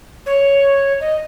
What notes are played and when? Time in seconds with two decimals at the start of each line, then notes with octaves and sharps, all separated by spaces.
0.26 C#5
1.00 D#5